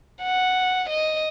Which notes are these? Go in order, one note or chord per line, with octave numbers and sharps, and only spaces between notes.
F#5
D#5